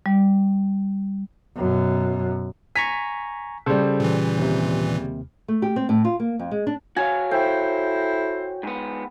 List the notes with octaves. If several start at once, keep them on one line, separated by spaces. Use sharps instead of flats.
G3
F#2 B2
G#5 A#5 C#6 B6
C#3 G3 A4 C5
A#2 E3
D#2 C3
A3
G4
C4
A2
F4
A#3
F2
G#3
D4
F#4 C#5 F5 G#5
E4 A4 C5 G5
G#2 B3